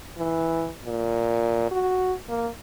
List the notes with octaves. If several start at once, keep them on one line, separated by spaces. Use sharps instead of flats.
E3
A#2
F#4
A#3